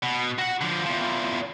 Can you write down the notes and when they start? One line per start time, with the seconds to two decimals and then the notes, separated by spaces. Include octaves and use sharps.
0.03 B2
0.39 F#4 F#5
0.61 D3 F3
0.85 E2 F3